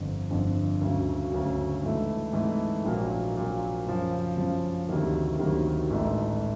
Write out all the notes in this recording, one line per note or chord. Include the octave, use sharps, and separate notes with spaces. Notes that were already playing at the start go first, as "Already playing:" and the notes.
Already playing: G1 F2 D3
G1 F2 D3
D2 C#3 F#3
D2 C#3 F#3
G#2 E3 A3
G#2 E3 A3
A#1 A#2 F#3 A#3
A#1 A#2 F#3 A#3
F#2 C#3 F3
F#2 C#3 F3
D2 C3 D#3 F#3 A#3
D2 C3 D#3 F#3 A#3
A1 G#2 E3 A3